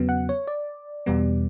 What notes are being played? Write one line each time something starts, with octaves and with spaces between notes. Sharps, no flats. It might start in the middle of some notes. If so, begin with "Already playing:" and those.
Already playing: E2 C#3 F#3 B3
F#5
C#5
D5
E2 B2 G3 B3